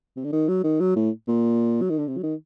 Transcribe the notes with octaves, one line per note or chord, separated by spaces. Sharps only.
C3
D3
D#3
F#3
D#3
F#3
A2
A#2
F#3
D#3
D3
C3
F#3
D#3